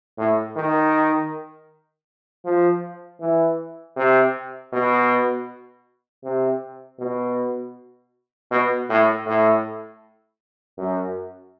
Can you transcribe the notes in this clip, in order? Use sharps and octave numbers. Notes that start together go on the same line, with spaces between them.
A2
D#3
F3
E3
C3
B2
C3
B2
B2
A2
A2
F#2